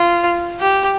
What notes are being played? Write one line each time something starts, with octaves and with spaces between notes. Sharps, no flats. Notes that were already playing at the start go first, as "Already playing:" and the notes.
Already playing: F4
G4